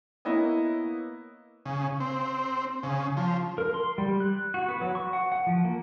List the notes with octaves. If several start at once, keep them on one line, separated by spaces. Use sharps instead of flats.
A#3 B3 E4 C#5 D#5
C#3
C4
C#3
F3
A#4
C6
G3
F#6
F#4
B3
F#3
C#6
F#5
F#5
F3
A#3